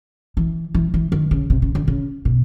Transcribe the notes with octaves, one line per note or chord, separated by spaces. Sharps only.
E3
E3
E3
D#3
C#3
C3
C#3
D3
C#3
B2